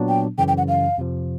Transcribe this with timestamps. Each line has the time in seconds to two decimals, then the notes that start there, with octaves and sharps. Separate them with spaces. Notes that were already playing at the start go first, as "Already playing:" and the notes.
Already playing: A#2 F#3 B3 D4
0.08 G5
0.38 F#2 C#3 E3 G5
0.48 G5
0.58 F#5
0.68 F5
0.98 F2 C3 F3